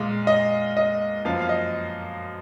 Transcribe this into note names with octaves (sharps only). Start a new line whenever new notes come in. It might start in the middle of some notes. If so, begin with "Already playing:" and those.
Already playing: A#2 G#3 F5
D#5
D#5
F#2 F3 A#3 F5
F5
D#5